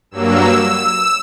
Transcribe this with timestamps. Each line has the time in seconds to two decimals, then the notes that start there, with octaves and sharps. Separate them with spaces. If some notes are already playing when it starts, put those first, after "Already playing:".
0.11 G2 F#3 A#3 E6
0.60 E6